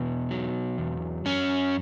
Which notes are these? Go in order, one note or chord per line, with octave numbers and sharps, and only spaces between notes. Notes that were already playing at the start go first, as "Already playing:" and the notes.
Already playing: E2 B2 B3
F#3
E2
F#2 C#4